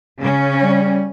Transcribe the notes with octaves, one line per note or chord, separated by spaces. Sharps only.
C#3 C#4
G3